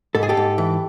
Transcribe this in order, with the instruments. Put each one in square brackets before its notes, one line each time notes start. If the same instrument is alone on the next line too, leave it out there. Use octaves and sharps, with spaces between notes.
[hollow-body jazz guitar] G#2 A4
G#4
G4 A4
G#2
E3